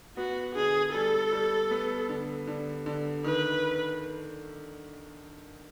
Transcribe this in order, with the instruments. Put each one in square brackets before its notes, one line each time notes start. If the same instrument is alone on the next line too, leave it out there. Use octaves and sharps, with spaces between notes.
[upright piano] B3 [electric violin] F#4
[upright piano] D3 [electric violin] G#4
[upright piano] G3 [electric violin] A4
[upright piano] G3
B3
D3
D3
D3
[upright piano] D#3 [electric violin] B4